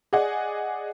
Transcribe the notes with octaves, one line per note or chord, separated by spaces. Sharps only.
G#4 D5 D#5 F#5 G#5